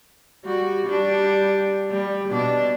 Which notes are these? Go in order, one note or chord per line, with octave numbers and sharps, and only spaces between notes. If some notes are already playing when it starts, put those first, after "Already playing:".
G3 F#4
G3 D4
G3
B2 D4